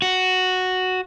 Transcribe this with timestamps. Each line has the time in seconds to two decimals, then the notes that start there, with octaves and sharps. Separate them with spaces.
0.02 F#4